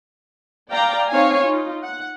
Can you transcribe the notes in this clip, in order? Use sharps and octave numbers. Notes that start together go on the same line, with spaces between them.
D5 F5 G5 A#5
C4 D#4 C#5 F5 G#5
D#4 F4
F#5